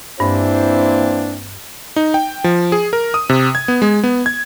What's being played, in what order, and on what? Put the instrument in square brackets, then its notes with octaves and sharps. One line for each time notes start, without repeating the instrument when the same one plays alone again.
[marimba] G2 [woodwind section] E3 A#3 C4 [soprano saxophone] D4 [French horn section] E4 C5
[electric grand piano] D#4
G5
F3
G#4
A#4
D#6
C3
G#6
B3
G#3
B3
G#6